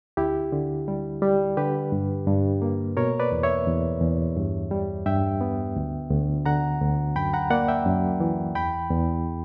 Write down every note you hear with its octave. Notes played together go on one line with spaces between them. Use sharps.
D2 E4 G4
D3
G3
G3
D3 G4 B4
G2
G2
A#3
B2 A#4 C#5
B4 D5
E2
C#5 E5
E2
E2
G2
G3
G2 E5 G5
B3
D2
D2
D3 F#5 A#5
D2
F#2 G5 B5
F#5 A#5
A#3 D5 F#5
E5 G5
F#2
E3
E2 G5 B5
E2